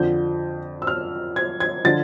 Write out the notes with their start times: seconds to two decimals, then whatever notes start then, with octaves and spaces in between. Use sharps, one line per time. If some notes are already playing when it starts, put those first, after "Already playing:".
Already playing: F2 D3 F3 G6
0.82 E6
0.87 F6
1.36 G#6
1.60 G#6
1.85 D3 F3 A6